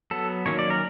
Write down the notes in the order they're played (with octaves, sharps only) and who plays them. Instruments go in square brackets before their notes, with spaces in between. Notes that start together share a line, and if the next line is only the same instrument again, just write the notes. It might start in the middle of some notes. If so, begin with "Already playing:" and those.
[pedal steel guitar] F#3 B3 A4
D#3 F#3 A#3 C#4 C#5
D5
A#4